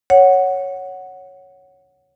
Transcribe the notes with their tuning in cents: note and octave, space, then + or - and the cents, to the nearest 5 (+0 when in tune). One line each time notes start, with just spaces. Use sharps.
C#5 +0 F#5 +0